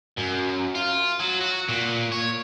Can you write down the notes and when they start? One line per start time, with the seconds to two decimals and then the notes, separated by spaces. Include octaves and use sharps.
0.17 F#2
0.75 F4
1.20 F#3
1.41 F#4
1.69 A#2
2.12 C#5